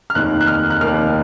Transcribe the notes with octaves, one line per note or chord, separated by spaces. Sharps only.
F6
F1 D#2 D#3 A#3 D#4 F#6
F#6
F6
F#6
F1 D#2 D#3 A#3 D#4 F6